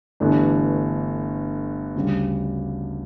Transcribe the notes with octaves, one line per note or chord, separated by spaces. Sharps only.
G1 G2 E3 A3 D4
D2 C#3 G3